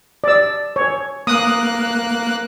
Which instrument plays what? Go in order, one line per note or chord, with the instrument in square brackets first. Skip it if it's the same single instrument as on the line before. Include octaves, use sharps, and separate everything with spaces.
[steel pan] D5 E6
C#5
[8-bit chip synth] A#3 F#6 [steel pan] D#6